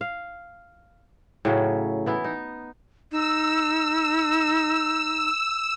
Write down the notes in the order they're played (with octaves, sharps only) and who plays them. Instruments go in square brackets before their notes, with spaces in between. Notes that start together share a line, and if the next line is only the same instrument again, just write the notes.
[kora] F5
A2 C#3 F#3
E3 B3 E4
D#4
[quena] D#4 [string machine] E6